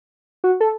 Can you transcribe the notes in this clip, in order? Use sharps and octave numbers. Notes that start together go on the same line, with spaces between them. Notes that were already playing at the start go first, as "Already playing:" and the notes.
F#4
A4